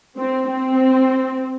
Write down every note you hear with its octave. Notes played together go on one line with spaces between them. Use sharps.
C4
C4